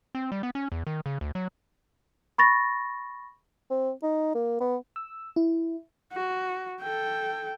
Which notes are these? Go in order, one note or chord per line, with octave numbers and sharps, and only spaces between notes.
C4
G3
B3
C#4
E2
D#3
C#3
D2
F#3
B5 C#6 A6 A#6
C4
D#4
A#3
B3
E6
E4
F#4
A4 G5